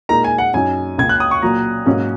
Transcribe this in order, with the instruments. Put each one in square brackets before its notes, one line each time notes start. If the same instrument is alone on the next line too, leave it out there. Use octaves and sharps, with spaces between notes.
[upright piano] A#2 G#3 D#4 A#4 [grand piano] A#5
[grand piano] G#5
F#5
[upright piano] F#2 F#3 D#4 [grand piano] G#5
[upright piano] C#2 C#3 A#3 [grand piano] G#6
[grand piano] F#6
D#6
C#6
[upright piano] A#2 F#3 A#3 F#4 [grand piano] A#5
[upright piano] G#2 F#3 A#3 C#4